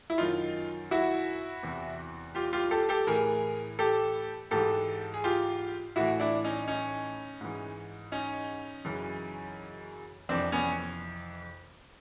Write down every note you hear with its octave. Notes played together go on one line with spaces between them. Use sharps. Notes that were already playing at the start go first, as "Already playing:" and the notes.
E4
F#2 D#3 D#4 F4
E4 F#4
E2 C3 E3
F4 G4
F4 G4
G4 A4
G4 A4
A2 E3 G#4 A#4
G4 A4
G#2 E3 G4 A4
G#4
F4 G4
A2 E3 E4 F#4
D4 E4
C#4 D#4
C#4 D#4
G#2 E3
C#4 D#4
F#2 C#3 E3
F2 C3 E3 C4 D4
B3 C#4